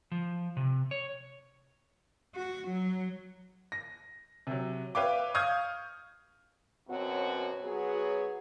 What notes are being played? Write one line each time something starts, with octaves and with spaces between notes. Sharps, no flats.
F3
C3
C#5
F#4
F#3
A#6
C3 F#3
B4 C#5 E5 F5 G5 D6
F5 C#6 D#6 F6 G6 G#6
F#2 B2 C4 F#4 C#5
F#3 B3 F#4 G#4 C#5